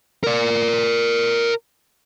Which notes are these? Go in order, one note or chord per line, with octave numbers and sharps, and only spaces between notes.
A#4 D5